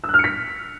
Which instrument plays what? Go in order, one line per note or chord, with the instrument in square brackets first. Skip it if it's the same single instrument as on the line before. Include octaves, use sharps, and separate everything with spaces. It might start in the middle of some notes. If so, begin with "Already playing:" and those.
[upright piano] E6
F#6
F6
C#7
B6